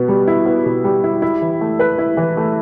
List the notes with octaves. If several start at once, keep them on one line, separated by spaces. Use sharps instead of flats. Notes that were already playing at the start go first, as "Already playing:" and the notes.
Already playing: B2 B3
G3
E4
B3
B2
G3
E4
E4
E3
A3
B4
E4
E3
A3